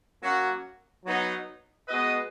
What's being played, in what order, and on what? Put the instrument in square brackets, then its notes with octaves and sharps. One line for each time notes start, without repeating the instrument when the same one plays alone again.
[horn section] F#3 A#3 C#4 F#4
F#3 B3 D#4
G#3 B3 F#4 B4 D#5